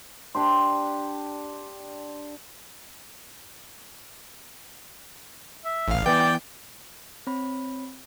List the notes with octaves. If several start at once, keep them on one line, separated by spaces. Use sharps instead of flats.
D4 G4 C6
E5
A1 F5
E3 B3 D5 G5
C4 C#5 B5